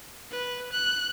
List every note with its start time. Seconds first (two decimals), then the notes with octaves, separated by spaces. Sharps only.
0.31 B4
0.72 F#6